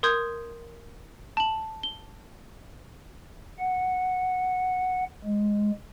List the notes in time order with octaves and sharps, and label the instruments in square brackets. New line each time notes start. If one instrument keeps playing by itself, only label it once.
[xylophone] A#4 C6 D#6 G6 G#6
A5 F#7
G7
[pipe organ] F#5
G#3